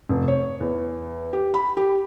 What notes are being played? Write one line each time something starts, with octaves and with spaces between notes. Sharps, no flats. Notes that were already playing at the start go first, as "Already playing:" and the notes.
F1
C#5
E2
G4
B5
G4